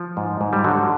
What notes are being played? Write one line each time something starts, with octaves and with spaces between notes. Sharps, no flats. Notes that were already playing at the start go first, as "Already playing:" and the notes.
Already playing: F3
G#2
G#2
G3
D3 F#3